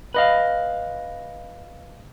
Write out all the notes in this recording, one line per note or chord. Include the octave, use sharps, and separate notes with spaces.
B4 D#5 F5